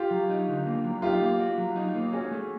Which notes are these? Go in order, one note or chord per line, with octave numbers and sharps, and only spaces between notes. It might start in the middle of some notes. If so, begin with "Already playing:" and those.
Already playing: F4 G4
F#3
D#4
D3
A#3
F#3
D#4 F4 G4
A#3
F#4
F#3
D#4
A#3
C#4 F#4 G#4
A3